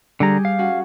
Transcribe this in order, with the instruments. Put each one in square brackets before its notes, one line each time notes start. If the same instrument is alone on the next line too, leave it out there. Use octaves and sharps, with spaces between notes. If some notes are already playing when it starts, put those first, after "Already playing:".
[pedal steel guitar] D3 A#5 [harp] G3 G4 G#4
[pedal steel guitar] F5
[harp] C#4 F#4 F#5